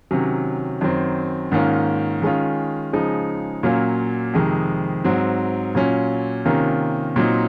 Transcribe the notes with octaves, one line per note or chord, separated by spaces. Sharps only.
C3 D#3 F#3 C#4
F#2 D#3 F#3 C4
G#2 D#3 A#3 C#4 F4
D#3 G#3 C#4 F4
C#3 F3 G#3 D#4
A#2 F#3 A#3 C#4 F4
F2 C3 D#3 G#3
G#2 F#3 C4
A#2 F#3 C#4 F4
C3 D#3 A#3 C#4 F4
A#2 F#3 C4 D#4